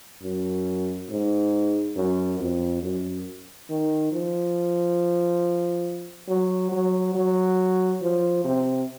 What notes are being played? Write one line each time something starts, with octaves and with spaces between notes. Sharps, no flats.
F#2
G#2
F#2
F2
F#2
D#3
F3
F#3
F#3
F#3
F3
C3